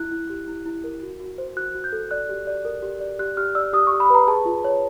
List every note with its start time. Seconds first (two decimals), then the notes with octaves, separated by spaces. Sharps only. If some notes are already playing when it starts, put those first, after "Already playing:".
Already playing: E4 F#6
0.12 E4
0.30 G4
0.48 E4
0.66 E4
0.84 A#4
1.03 F#4
1.20 F#4
1.38 C5
1.56 F#4 F#6
1.74 F#4
1.84 G6
1.92 A4
2.11 D5 F#6
2.29 G4
2.47 D5
2.65 A#4
2.82 G4
3.01 D5
3.19 G4 F#6
3.37 G4 F6
3.55 D5 E6
3.73 G4 D#6
3.87 C#6
3.92 G4
4.00 B5
4.10 B4 A#5
4.28 G#4 A5
4.45 F4
4.64 C#5